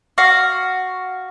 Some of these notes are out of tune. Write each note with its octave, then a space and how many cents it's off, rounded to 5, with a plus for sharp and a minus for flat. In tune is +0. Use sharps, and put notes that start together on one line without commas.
F#4 +0 F5 +0